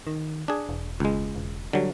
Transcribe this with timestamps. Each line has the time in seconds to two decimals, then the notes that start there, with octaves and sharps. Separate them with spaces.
0.07 D#3
0.48 D4 G#4
0.69 E1
1.00 C#2 G#3
1.36 E1
1.73 D3 F#3 G3